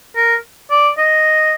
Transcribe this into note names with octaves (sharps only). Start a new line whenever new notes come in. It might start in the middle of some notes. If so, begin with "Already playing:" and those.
A#4
D5
D#5